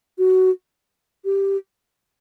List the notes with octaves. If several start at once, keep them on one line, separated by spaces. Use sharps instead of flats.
F#4
G4